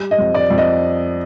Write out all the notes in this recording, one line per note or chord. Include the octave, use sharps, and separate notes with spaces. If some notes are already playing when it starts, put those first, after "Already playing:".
Already playing: G3
D#5
F2
D5
F2
D#5